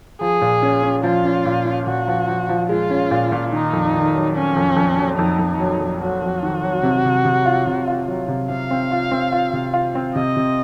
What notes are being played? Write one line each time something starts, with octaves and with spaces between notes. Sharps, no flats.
F3 G#4
A#2
C#4
C#4
F3 F4
C#4
A#2
C#4
A#2 F#4
F3
F3
F3
G#3 F4
C#4
A#2
A#2
D#3 D#4
F2
D#3
F#3
F#3 C#4
F2
F2
F#3
F2 D#4
F2
F#3
F2
F#3 F#4
F2
D#3
F#3
C3
C3
C3
F4
C3
F4
F#3
C3
C3 F5
C4
F4
C4
F4
C3
F4
C4
C3 D#5
C3